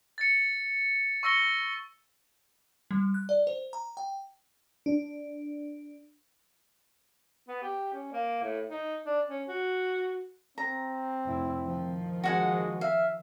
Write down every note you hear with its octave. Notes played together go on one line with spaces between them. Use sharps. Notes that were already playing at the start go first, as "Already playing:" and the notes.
A6 C#7
C#6 E6 A#6 C#7 G7
G3
F#6
D5
C5
A#5
G5
D4
B3
G4
C#4
A#3
A2
D#4
D4
C#4
F#4
C4 A#5
F1 E4
D#3 F3
G#3 F#4 F#5 G#5
E5 F5